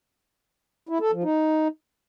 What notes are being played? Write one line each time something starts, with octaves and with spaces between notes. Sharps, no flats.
E4
A4
F3
D#4